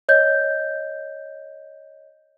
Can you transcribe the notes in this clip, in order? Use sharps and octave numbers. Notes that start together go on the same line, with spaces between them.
C#5 D#5 G6